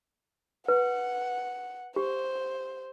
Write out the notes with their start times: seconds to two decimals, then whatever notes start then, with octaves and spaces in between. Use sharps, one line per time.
0.68 B4 F#5
1.96 G4 C5